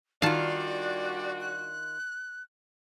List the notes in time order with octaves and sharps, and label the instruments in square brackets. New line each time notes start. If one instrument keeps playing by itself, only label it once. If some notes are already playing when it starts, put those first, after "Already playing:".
[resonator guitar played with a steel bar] D#3 F4 [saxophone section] G3 D4 F#4 [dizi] D5 [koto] F5 A5
[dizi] F#6